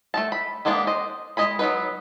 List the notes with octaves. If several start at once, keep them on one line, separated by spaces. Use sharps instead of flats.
A3 E4 A5
B5
E3 G#3 A#3 B3 D4
C5 D#5
G#3 D4 D#5 G#5 B5
F#3 B3 D#4 B4